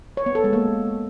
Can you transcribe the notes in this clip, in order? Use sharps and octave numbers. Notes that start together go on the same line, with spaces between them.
C#5
B3
A4
G#3
A#3